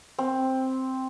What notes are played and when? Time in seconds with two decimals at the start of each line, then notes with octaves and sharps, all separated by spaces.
0.19 C4